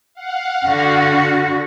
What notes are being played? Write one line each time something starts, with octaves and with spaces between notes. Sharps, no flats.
F5 F#5
D3 F#4